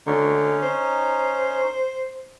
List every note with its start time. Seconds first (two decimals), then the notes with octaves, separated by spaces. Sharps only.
0.07 D3 C#4 D#4
0.63 C5